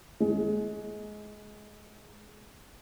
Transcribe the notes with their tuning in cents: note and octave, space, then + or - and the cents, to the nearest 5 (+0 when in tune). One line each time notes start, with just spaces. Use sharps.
G#3 +20